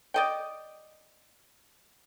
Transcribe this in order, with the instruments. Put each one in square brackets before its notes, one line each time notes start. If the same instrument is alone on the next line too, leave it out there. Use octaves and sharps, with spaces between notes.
[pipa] D5 D#5 G5